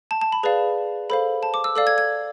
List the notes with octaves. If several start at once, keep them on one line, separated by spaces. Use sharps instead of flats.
A5
A5
B5
G#4 B4 D5 F5
A4 C5 F5 B5
A5
D6
E6
A4 D5 F5 E6
G#6
G#6